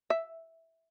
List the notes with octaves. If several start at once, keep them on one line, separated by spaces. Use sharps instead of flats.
E5